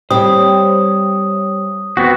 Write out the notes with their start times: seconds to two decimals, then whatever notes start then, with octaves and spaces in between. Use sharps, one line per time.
0.11 G3 C4 C5 C#5 D#6
1.97 B3 C4 F#4